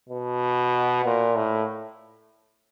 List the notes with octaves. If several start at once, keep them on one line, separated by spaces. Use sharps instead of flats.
B2
A#2
A2